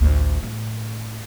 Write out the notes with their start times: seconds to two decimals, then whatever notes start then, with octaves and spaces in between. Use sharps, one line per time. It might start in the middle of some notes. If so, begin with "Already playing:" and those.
0.01 A1 D2
0.43 A2